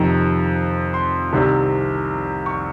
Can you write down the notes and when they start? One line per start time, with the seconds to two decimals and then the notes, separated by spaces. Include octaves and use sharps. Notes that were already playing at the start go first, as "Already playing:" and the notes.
Already playing: F2 C3 D#3 A#5
0.94 C6
1.32 C2 C3 D#3
2.46 C#6